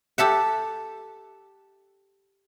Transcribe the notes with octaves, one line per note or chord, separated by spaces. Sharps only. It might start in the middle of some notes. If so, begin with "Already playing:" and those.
G4 A4 E5 F#5